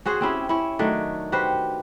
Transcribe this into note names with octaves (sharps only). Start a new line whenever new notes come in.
C#4 F#4 G#4 C5
C4 C#4 E4 G4
C#4 E4
D#3 F#3 A3 D4
F#4 G4 B4 C5